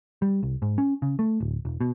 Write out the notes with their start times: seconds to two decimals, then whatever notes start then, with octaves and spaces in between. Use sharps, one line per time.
0.22 G3
0.43 C2
0.62 G#2
0.78 C#4
1.02 C#3
1.19 A3
1.40 D1
1.65 E1
1.81 B2